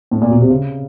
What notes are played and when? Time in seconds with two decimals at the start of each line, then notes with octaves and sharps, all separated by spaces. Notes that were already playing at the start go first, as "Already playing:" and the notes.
0.11 A2
0.21 A#2
0.30 B2
0.40 C3
0.49 C#3